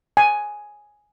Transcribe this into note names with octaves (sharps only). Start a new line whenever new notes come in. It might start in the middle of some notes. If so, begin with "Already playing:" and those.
G#5